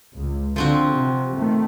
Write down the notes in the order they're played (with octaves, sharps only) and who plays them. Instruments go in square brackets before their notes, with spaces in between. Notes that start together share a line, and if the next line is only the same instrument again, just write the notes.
[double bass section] C#2
[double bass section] D3 [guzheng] F3 C4 F#4
[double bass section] C3
D#3 A3